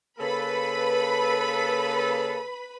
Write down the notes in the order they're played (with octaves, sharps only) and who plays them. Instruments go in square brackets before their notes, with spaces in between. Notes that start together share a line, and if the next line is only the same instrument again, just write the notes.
[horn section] C#3 A#3 A4 [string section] B4 B5